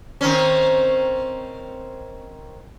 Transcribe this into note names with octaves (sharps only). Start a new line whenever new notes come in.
D#3 C4 C#4